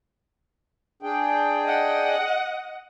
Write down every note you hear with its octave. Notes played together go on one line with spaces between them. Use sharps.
D4 G#4 G5
D#5 F#5